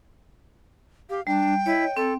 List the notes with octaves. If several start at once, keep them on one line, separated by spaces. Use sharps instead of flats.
G4 F5
G3 D4 G5
E4 C#5 D#5
C4 A4